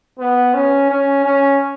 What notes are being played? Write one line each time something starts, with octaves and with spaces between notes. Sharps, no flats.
B3
C#4
C#4
C#4